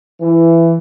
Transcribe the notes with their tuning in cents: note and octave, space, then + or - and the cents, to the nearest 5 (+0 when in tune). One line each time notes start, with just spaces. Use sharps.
E3 +15